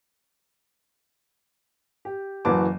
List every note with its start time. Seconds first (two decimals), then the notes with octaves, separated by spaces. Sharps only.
2.05 G4
2.45 F#1 E3 F#4 B4 A5 D6